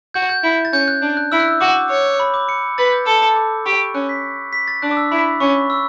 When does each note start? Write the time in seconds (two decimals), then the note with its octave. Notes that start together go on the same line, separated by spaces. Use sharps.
0.14 F#4 G6
0.29 G6
0.43 E4
0.65 A6
0.73 C#4 G6
0.88 F#6
1.02 D4
1.17 F#6
1.32 E4 E6
1.40 F#6
1.48 E6
1.61 F#4 D6
1.89 C#5
2.20 B5
2.34 D6
2.49 C#7
2.78 B4 A6
2.92 G6
3.06 A4 E6
3.36 D6
3.66 G4 C#6
3.94 C#4 F#6
4.09 B6
4.53 B6
4.68 A6
4.82 D4 F#6
4.91 D6
4.97 E6
5.11 E4 B5
5.40 C#4 C#6
5.70 E6